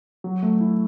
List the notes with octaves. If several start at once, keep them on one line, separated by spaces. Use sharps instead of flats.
F#3
A3
E4